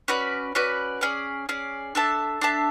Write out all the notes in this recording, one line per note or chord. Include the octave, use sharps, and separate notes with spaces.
C#4 F#4 B4 D5
C#4 F#4 B4 D5
C#4 G#4 D5
C#4 G#4 D5
D4 A4 E5 A5
D4 A4 E5 A5